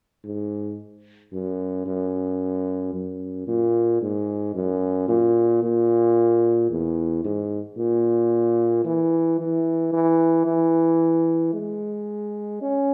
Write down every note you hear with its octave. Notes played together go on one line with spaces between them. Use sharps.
G#2
F#2
F#2
F#2
A#2
G#2
F#2
A#2
A#2
E2
G#2
A#2
E3
E3
E3
E3
G#3
C#4